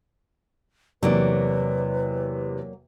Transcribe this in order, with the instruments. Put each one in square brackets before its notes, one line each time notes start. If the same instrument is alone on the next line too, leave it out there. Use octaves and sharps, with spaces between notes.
[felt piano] E2 C3 [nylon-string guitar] F#3 A#3 D5 [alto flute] B4